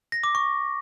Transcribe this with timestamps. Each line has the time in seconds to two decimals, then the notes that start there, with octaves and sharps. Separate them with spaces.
0.12 A#6
0.24 D6
0.35 C#6